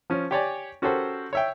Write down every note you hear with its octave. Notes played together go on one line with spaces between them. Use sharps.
F3 C#4
G4 C#5 D5 G#5
C#4 F#4 G4 A4 A#4 C5
C#5 E5 G5